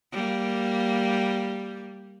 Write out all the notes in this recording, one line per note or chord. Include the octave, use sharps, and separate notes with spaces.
G3 A#3